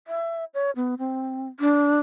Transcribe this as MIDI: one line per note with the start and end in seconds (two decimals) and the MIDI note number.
0.07 0.45 76
0.54 0.71 73
0.76 0.95 59
0.99 1.48 60
1.60 1.99 62